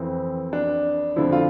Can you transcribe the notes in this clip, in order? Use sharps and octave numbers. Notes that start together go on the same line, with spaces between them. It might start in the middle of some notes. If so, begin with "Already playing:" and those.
Already playing: F2 E3 C4
D4
F2 D3 F3 E4
F4